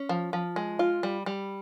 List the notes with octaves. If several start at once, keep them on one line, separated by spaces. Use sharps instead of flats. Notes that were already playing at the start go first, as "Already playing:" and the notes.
Already playing: C#4
F3
F3
G#3
F4
G3
G3